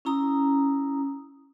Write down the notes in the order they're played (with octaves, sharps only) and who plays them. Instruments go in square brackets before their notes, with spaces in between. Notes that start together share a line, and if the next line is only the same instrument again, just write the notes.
[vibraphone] C#4 E4 A#5 D#6